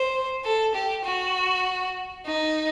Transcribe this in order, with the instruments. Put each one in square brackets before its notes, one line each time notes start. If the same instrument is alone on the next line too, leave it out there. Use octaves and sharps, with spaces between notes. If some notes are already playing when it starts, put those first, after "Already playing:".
Already playing: [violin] C5
A4
G4
F#4
D#4